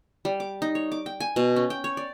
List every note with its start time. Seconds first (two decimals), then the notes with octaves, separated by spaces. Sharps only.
0.25 G3
0.40 D6
0.62 D#4
0.75 C#5
0.92 D6
1.06 G5
1.20 G#5
1.36 B2
1.56 C#4
1.70 G5
1.84 C#5
1.97 D5